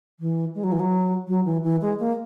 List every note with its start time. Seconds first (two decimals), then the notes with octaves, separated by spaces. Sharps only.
0.20 E3
0.55 G#3
0.63 F#3
0.72 E3
0.79 F#3
1.28 F#3
1.45 E3
1.63 E3
1.81 G#3
1.99 A#3